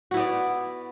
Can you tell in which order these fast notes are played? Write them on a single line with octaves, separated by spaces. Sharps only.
F#4 E4 B3 D5